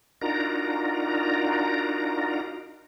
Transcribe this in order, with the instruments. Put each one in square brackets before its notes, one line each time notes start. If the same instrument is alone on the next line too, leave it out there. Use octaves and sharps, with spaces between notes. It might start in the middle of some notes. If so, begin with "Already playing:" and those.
[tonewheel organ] D4 D#4 F4 F#4 A#4 A#5